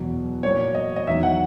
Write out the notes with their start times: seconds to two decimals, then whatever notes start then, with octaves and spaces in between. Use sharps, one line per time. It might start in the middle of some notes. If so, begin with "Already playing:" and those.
Already playing: E2 B2 F#3
0.43 A#2 F#3 C#5
0.75 D#5
0.96 D#5
1.07 E2 D#3 F#3 E5
1.23 F#5